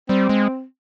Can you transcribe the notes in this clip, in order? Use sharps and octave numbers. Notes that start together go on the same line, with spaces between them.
G3 C4
G#3